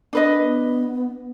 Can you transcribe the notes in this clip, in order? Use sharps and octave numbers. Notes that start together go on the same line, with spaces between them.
D4 B4 D#5
B3